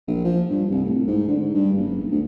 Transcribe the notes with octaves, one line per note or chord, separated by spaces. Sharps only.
A#1
F3
G2
C2
A2
G#2
D3
G#2
G2
F#1
B1
D2